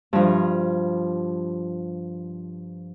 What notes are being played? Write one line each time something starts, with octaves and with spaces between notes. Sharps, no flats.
G2 F3